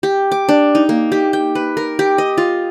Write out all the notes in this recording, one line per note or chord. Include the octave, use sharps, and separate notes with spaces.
G4
D6
D4
D#4
A#3
G4
G5
B4
A#4
G4
D#5
F4